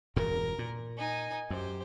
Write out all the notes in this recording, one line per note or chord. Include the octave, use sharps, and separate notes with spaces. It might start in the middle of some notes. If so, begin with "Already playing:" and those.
E1 G2 A#2 A#4
A#2
D#4 G#5
F#2 G4 C5